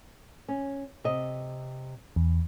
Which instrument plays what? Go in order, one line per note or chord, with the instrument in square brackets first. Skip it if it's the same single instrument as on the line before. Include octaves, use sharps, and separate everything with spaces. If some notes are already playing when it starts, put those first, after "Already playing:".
[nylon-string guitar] C#4
C3 D#5
[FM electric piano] E2